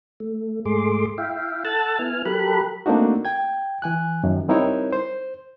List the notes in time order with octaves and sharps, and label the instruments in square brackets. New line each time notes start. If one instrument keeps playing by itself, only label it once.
[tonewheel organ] A3
G#2 G#3 A3 G#4 C6 D6
E4 E5 F5 G5
A4 F#5 A5 E6 F#6 A6
B3 E4 G#5 F6
F#3 G4 A4 A#4 B5 F#6
[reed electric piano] A3 A#3 C4 D4 D#4 F#4
G5 G#6
E3 G#5 F#6
F#2 D#3
G3 C4 D#4 E4 A#4 C#5
C5